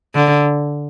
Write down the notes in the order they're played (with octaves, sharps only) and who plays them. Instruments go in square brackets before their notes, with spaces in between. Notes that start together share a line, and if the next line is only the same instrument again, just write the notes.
[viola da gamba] D3